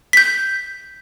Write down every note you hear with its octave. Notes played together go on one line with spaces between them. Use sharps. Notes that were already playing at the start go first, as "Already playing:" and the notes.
G6 B6